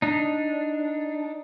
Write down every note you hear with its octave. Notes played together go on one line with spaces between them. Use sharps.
D4 D#4